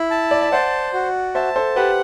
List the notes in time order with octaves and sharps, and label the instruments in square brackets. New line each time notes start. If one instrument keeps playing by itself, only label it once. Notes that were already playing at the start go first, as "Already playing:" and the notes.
Already playing: [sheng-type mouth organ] E4
A5
[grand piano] D5
E5
[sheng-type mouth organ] C5 [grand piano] D5 F#5
[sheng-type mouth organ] F#4
[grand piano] C5 E5 [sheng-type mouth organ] A5
[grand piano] A4 C5
[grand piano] G4 B4 [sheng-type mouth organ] F#5